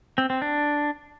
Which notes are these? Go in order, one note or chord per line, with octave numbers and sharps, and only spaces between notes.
C4
C4
D4